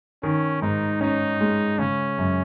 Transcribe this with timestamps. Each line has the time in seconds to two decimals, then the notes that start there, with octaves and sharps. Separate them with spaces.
0.23 D#3 C#4
0.62 G#2 D#4
1.01 C#4 D#4
1.41 G#3
1.79 C#3 C#4
2.18 F#2